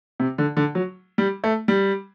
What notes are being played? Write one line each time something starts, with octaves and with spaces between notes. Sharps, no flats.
C3
D3
D3
F#3
G3
A3
G3